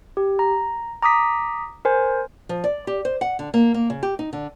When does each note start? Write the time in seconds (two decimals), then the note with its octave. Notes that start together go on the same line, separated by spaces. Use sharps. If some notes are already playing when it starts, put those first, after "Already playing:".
0.17 G4
0.39 A#5
1.02 A#5 D6 D#6 B6
1.85 A#4 C5 G#5
2.49 F3
2.64 D5
2.87 G4
3.05 C5
3.21 F#5
3.39 D3
3.54 A#3
3.74 A#3
3.90 C#3
4.03 G4
4.19 D#4
4.33 D3